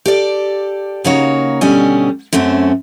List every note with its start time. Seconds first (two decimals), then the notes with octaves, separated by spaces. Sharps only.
0.06 G4 A4 D5
1.04 C#3 A#3 D#4 F#4 C#5
1.61 B2 D3 G3 C#4 D#5 G#5
2.33 F#2 A3 C4 C#4